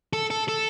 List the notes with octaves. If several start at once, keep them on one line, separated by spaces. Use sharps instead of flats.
A4
A4
A4